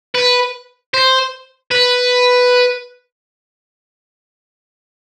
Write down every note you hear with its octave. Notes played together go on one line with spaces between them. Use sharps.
B4
C5
B4